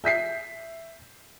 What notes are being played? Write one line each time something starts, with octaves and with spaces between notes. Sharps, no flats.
E5 G6 B6 C7